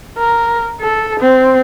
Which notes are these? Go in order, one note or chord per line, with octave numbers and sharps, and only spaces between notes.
A#4
A4
C4